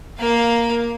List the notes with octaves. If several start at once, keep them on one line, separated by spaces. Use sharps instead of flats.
A#3 F5